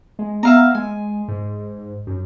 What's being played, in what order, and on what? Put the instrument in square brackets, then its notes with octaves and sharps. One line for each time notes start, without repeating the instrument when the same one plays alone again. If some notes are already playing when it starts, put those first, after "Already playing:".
[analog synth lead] G#3
[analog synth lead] B3 [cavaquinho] E5 F5 A#5
[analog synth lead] G#3 [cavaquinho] G#5
[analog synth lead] G#2
F#2